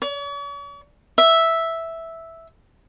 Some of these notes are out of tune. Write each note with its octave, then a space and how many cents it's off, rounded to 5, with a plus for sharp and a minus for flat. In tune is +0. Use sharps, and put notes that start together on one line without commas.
C#5 +45
E5 -5